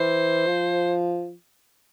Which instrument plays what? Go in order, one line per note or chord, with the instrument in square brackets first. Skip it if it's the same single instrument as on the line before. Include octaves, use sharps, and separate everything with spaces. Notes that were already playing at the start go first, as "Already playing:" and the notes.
Already playing: [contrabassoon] E3 [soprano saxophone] C5
[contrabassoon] F3